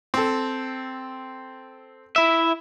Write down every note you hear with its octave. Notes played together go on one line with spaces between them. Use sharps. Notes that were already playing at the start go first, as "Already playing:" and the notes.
C4 A4
E4 E5